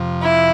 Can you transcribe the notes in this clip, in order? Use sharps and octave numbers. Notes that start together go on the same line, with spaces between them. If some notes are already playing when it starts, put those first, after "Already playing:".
Already playing: F2 C3 F3
E4